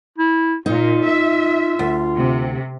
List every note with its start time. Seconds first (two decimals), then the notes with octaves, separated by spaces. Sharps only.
0.18 E4
0.66 A#2 D#4 F4
1.06 E5
1.79 D2
2.17 C3